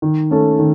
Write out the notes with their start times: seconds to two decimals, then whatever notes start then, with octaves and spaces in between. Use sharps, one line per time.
0.02 D#3
0.31 A3 C#4 A4
0.59 D#3